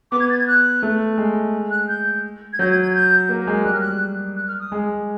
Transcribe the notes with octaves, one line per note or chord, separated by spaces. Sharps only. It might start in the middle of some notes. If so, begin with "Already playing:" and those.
B3 D6
G#6
A6
G#6
F#6
A3
G#3
F#6
G6
G#6
F#3 G6
G#6
G#6
G6
A#3
G#3
G3 F#6
F6
F#6
F#6
F6
D#6
G#3